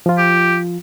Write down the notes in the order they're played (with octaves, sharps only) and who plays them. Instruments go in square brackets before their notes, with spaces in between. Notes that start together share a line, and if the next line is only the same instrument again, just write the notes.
[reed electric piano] F3 F4
[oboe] G4